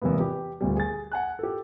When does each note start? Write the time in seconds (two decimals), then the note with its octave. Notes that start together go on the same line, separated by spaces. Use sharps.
0.02 E2 G#2 C3 A#3 B3
0.20 G4
0.61 D2 A#2 G3
0.76 G#4 A6
1.12 F#5 G#5 F#6
1.39 G4 A4